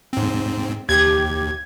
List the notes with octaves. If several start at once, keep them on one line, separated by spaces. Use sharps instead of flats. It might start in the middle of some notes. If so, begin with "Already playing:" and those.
G#2 C4
D#2 G4 G#6